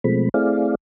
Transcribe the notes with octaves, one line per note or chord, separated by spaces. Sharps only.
B2 F3 G#3 A3 C4 B5
A3 C4 E4 G#4 D5 F5